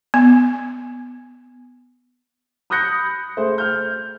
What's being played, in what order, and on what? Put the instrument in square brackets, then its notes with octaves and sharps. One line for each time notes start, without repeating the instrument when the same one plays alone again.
[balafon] B3
[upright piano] B5 D#6 F#6 G6 A#6 C#7
A3 G#4 C5
F6 G6